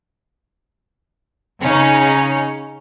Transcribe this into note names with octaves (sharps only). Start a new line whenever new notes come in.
C#3 C#4 D#4